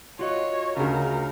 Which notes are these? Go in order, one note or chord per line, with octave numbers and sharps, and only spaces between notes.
F4 F#4 C#5 D#5
D2 C#3 A#4